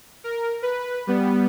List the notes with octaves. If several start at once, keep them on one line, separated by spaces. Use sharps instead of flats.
A#4
B4
G3 B3